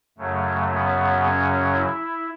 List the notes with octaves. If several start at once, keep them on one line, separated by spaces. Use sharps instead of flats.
F#2 C#3 F#3 A3
B3
C#4
E4